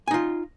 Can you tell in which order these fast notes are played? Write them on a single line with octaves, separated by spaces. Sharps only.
G#5 D#4 F4